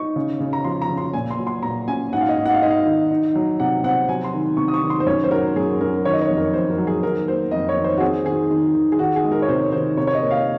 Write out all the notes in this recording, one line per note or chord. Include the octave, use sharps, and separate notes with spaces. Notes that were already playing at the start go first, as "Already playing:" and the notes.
Already playing: D#4 C#6
C#3
C#3
A#5
F3 C6
A#5
C#3
C6
A#2 G#5
C6
F#3
C6
A#2 A#5
C#4 G#5
G#2 F#5
F5
D#5
G#2
F#5
F5
G#2 D#5
F5
D#3
D#4
F#3
C3 F#5
C4 F#5
F#3 G#5
C6
D#3
C3 C#6
D#6
C#6
D#3
C6
C5
F#2 C#5
C5
F#3 A#4
F#2 G#4
F#2 A#4
D#3 C#5
D#5
C#5
F2
A#4
F2 C5
A#4
F#3
G#4
D#3 A#4
A#3 C5
F2 D#5
C#5
D#3
C5
F#4
C4 G#4
D#3 G#4
D#3
D#3
G#4
D#3 F#4
G#4
G#3
A#4
C#5
C3 C5
D#3 C5
C3 C#5
C#5
D#5
A#3
F5